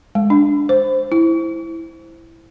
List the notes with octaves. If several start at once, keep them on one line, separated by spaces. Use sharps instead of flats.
G#3
D4
C5
E4